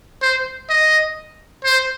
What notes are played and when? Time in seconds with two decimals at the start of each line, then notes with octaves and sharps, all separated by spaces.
0.22 C5
0.69 D#5
1.64 C5